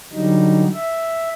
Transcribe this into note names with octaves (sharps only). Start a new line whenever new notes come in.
D3 F#3 G3 D#4
E5